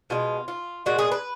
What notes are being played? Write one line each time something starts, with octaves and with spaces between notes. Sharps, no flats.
B2 G#3 F4
F4
A#2 G#3 F#4
G#4
B4